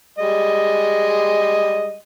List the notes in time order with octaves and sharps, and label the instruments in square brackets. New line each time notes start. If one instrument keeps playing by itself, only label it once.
[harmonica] G3 G#3 D#5